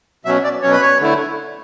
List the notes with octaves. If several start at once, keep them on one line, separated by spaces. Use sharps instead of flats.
B2 F#3 C#4 E5
D5
B2 F#3 C#4 C#5
B4
C#5
D3 A3 E4